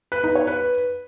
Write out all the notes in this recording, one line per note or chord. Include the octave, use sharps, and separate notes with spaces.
B4
D#4
C#5
B4